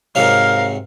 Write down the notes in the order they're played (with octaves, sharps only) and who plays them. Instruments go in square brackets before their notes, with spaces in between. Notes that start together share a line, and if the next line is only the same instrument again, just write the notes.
[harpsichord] G#2 C3 F#3 [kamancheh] A#4 F5